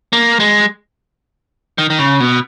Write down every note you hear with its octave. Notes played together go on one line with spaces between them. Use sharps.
A#3
G#3
D#3
D#3
C#3
B2